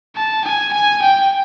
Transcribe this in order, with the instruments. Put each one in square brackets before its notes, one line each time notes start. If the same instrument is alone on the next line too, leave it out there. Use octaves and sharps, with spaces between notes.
[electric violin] A5
G#5
G#5
G5